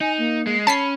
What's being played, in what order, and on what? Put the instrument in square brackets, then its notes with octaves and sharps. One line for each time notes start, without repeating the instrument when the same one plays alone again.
[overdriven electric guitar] D#4 [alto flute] G#5
[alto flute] A#3
[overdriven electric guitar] G#3
[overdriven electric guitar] C#4 [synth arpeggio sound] A5 B6 C7 [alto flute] B5